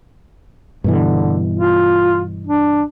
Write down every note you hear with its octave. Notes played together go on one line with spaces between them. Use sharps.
G2 B2 D3 E3
F4
D4